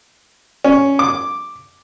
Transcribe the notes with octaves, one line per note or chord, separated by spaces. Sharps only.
C#4
D6